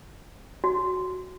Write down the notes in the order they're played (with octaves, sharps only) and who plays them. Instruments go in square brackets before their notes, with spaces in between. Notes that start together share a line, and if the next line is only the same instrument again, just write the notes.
[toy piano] F#4